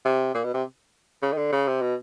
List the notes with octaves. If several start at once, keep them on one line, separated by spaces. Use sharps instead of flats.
C3
A#2
B2
C3
C#3
D#3
D3
C#3
C3
B2